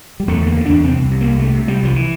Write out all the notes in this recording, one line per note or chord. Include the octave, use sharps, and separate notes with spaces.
G3
E2 A3
D3
A#3
D3
E2 D4
C3 C4
C2
C3
C2 A#3
C3 A3
C3
C3 G3
C2 F3
E3